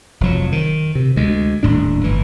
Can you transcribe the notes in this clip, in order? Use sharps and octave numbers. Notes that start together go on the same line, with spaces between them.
F1 F3 F#3
D#3
C3
D2 G#3
D#1 A2 D4
G1 E3